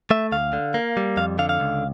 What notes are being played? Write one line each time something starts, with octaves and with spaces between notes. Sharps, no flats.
A3 E5
D2 F5
D3
A#3
G3
F2 F5
D3 F5
F5
C#2